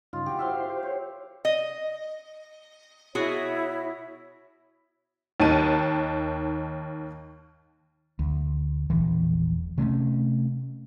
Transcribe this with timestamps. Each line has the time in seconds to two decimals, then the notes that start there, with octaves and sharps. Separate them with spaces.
0.13 G2 C#3 D#4 F4
0.26 F#4 G4
0.39 E4 C5 E5 F5 C6
0.70 G4 C5
0.83 C#5
1.45 D#5
3.15 B2 E4 F#4 G#4 C#5
5.40 D#2 D#3 A5 D#7
8.19 D2
8.90 E1 A#1 E3
9.78 C3 A3 C4 C#4